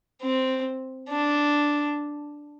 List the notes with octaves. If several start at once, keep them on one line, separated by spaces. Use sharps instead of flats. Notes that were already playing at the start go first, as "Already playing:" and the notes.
C4
D4